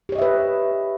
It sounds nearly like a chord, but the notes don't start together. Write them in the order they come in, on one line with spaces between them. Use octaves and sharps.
G4 C#5 D#5 E5 B4